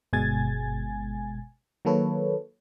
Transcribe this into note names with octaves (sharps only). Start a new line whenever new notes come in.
G1 B2 G#3 G#5 G#6 A6
D#3 F#3 A#3 A4 B4 C#5